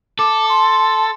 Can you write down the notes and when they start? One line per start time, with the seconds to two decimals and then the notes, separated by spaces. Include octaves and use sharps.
0.19 A4 D6
0.49 C6